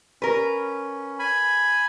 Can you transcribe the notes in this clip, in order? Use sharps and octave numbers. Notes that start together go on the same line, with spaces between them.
C#4 A#4 B4
G#5 B5